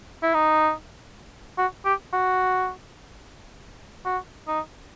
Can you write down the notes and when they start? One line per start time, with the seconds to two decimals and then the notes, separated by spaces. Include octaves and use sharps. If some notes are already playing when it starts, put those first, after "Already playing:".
0.23 E4
0.34 D#4
1.58 F#4
1.85 G4
2.13 F#4
4.05 F#4
4.47 D#4